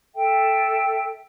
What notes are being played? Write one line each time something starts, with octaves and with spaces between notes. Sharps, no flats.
A4 E5 G5